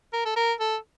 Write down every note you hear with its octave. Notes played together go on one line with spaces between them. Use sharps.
A#4
A4
A#4
A4